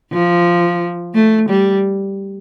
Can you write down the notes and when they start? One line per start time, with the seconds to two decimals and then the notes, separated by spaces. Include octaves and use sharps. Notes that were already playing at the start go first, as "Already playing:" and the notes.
0.12 F3
1.15 A3
1.49 G3